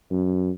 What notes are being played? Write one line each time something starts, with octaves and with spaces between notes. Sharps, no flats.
F#2